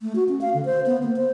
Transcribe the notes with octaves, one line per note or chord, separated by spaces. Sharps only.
A3
F#4
C#4
F5
D3
C5
B3
A#3
C5